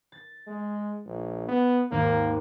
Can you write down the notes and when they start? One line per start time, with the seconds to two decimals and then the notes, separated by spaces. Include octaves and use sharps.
0.12 A6
0.47 G#3
1.06 A#1
1.48 B3
1.91 G#1 D#2 A#3